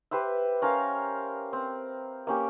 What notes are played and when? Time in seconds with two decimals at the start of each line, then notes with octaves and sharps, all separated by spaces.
0.11 G4 B4 C5 E5
0.62 C#4 A#4 C5 F5
1.53 C4
2.27 A#3 C#4 G4